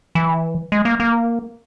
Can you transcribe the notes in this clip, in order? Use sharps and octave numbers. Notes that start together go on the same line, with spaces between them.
E3
G#3
A#3
A#3